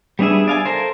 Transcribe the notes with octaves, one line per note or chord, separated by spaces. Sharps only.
G3 B3 D4 G#4 E5
D5 F5 G#5
A4 A#4 C5